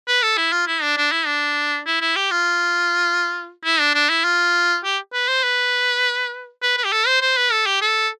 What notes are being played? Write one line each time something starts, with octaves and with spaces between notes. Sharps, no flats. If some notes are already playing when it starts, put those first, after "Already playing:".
B4
A4
E4
F4
E4
D4
D4
E4
D4
E4
E4
G4
F4
E4
D4
D4
E4
F4
G4
B4
C5
B4
B4
B4
G4
A4
C5
C5
B4
A4
G4
A4